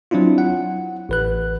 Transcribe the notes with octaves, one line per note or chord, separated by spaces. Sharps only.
F#3 C4 D4 E4 F4
F#5
A1 B4 F#6